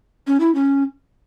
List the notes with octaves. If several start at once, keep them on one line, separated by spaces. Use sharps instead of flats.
C#4
E4
C#4